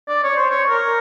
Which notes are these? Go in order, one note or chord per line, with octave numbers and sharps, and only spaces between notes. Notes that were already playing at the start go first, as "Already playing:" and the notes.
D5
C#5
C5
C#5
A#4